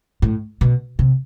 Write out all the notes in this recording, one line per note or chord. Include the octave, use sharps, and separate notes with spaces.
A2
B2
C3